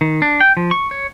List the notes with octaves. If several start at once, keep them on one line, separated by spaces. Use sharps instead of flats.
D#3
D4
G5
F3
C#6
C#5